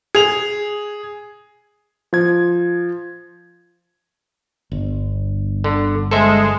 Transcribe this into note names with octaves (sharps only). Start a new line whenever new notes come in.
G#4 F7
F3 G#6
G1
D3
G#3 A4 C5 E5